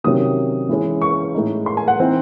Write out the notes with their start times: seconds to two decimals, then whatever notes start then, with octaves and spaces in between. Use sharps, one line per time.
0.04 C3 D#3 F#3 C#4 D#6
0.69 E3 G#3 C#4
1.02 C#6
1.34 A2 G#3 D#4
1.66 C6
1.77 G#5
1.88 F#5
2.00 E3 C4 D#4